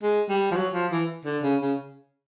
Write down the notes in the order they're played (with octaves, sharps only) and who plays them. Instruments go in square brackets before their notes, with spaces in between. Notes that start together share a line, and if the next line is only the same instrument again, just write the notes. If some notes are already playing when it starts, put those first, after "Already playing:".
[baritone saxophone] G#3
G3
F3
F#3
F3
E3
D3
C#3
C#3